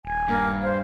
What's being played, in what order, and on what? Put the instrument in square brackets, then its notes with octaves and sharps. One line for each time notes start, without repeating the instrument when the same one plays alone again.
[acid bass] D#1 [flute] G#5
[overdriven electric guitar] G2 [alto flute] A#3
[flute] C5 [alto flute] F5